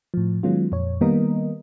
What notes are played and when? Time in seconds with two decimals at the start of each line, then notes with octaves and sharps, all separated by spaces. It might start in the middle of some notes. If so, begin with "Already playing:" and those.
0.14 A2 F3
0.43 D#3 F#3 G#3 B3 C#4 F4
0.72 F2 A#2 C#5
1.01 D#3 G3 A#3 B3 A#4 D#5